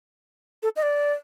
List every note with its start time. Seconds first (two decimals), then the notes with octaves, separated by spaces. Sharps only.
0.63 A4
0.76 D#5
0.83 D5